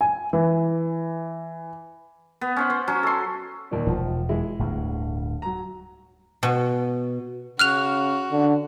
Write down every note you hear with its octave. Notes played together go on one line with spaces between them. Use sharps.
G#5
E3
B3
C#4 C5 F#5
C5
F#3 C#4
A4 C6
D#2 A#2
E1 F3
E3 G#3 E4
D1 D2 G2
F#3 A#5
B2
C#3 F#4 F6 F#6 F7
D3